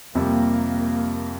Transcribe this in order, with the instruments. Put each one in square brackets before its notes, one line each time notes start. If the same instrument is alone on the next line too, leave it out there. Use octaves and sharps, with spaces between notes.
[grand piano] F2 C3 G3 [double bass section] A#3